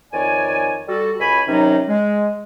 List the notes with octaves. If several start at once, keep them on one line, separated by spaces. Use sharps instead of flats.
F2 D#3 C#5 D5 G#5
G3 F#4 A4
C#2 C#5 G#5 B5
C3 D#3 F#3 C#4 D#4
G#3